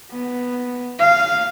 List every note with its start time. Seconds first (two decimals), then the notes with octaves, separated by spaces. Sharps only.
0.11 B3
0.99 F5